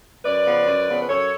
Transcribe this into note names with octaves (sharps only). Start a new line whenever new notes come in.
F#2 B4 D5
C#3 F3 B3
F#2
C#3 F3 B3
B4
F#2 A4 C#5